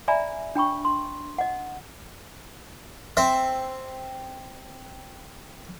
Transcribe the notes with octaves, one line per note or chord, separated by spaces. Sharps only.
D5 E5 G#5 A#5 B5
D4 G5 B5 C#6
C6
D#5 F#5
C4 E5